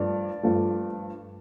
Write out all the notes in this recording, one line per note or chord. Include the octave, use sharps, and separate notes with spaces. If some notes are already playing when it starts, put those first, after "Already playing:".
Already playing: G2 F3 A3 D5
G2 F3 A3